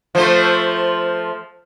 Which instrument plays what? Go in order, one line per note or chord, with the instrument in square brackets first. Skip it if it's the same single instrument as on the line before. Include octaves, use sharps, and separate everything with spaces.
[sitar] F3 A3 [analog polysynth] C5